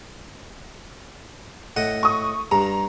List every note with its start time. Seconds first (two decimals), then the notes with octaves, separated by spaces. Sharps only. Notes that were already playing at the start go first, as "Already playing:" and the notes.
1.76 A2 D#5 F#5
2.03 C#6 D#6
2.51 G2 A#5